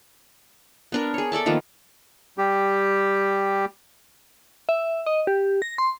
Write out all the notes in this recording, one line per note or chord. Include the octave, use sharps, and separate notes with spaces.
B3 D4 A#4
G#4 C#5
A4 D5 E5 A5
D#3 F3 A#3 B3
G3 G4
E5
D#5
G4
A#6
C6